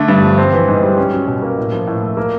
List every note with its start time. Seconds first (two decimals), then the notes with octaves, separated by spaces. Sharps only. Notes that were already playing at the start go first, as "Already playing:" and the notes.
Already playing: D3 A3
0.08 G2
0.23 F3
0.38 C4
0.53 E3
0.68 G#2
0.82 G3
0.98 C#4
1.12 F#3
1.27 B2
1.42 A#3
1.58 A2
1.72 F3
1.87 A2
2.02 A3
2.17 A#3